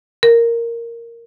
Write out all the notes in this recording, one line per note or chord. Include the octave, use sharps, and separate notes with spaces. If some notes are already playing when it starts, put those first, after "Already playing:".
A#4